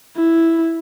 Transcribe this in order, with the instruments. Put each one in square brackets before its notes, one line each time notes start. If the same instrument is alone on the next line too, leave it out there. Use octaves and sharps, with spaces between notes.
[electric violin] E4